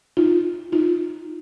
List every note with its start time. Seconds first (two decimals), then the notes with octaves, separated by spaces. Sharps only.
0.17 D#4 F4
0.72 D#4 F4